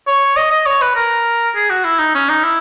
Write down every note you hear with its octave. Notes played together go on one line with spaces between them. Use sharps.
C#5
D#5
D#5
C#5
B4
A#4
G#4
F#4
E4
D#4
C#4
D#4
E4